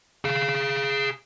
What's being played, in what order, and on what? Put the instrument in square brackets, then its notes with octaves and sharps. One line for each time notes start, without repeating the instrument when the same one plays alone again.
[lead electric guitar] G#4 F5